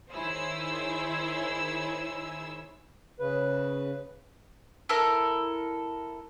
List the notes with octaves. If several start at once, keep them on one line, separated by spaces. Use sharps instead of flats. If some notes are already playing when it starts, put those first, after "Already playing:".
D#3 E4 G#4 C5 C#5 E6
C#3 B4
E4 A4 A#4